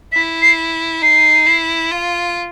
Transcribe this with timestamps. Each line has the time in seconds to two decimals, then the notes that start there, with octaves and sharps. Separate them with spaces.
0.12 E4 B6
0.42 C7
1.02 D#4 C7
1.47 E4
1.91 F4